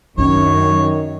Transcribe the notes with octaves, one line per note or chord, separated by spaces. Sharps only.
F#2 D#3 C#4 D4 C#5